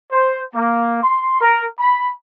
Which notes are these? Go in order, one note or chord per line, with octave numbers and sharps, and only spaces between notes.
C5
A#3
C6
A#4
B5